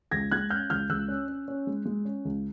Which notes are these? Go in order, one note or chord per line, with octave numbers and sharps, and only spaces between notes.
C#2 G#6 A#6
G#3 F#6 G#6
C#4 F6 G6
C#2 F6 G6
C#2 E6 F#6
C#4
C#4
C#4
G#3
G#3
C#4
C#2